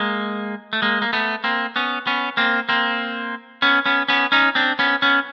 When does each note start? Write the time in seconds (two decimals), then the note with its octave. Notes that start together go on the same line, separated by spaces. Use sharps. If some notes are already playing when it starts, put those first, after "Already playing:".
Already playing: G#3 A#3
0.73 A3
0.82 G#3 A#3
1.02 A#3
1.13 A3 B3
1.44 A#3 C4
1.76 B3 C#4
2.07 B3 C#4
2.37 A#3 C4
2.69 A#3 C4
3.62 B3 C#4
3.86 B3 C#4
4.08 B3 C#4
4.32 C#4 D#4
4.55 C4 D4
4.79 B3 C#4
5.02 B3 C#4